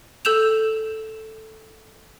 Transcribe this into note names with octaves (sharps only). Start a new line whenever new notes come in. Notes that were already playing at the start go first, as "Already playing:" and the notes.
A4 E6 G6 E7 F7